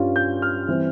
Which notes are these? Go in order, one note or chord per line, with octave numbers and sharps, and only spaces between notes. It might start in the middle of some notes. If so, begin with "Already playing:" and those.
Already playing: G2 G3 C#4 F4
G6
F6
E3 G3 C4 E4